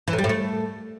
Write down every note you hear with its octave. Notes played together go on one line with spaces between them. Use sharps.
E3
A2
G3
A2
A3